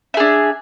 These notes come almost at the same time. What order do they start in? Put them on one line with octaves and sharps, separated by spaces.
E5 G#4 D4